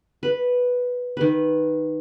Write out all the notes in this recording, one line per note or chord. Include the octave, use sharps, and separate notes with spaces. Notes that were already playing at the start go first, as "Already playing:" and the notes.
B4
D#3 B4